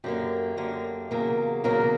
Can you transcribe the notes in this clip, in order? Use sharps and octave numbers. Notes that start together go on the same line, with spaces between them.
F#2 D3 A#3 G4
F#2 D3 A#3
E2 C#3 F#3 A#3
E2 C#3 F#3 A#3 A#4